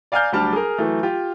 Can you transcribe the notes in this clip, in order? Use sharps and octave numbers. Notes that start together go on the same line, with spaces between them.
D5 F5 G#5 A#5 F6 G6
D2 F#3 G3 D4 A5 F6
G#4 A#4
E3 F#3 A3
F4 G4